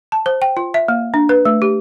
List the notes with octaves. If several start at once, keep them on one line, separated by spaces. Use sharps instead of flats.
A5
C5
G5
F4
E5
A#3
D4
B4
A3
G4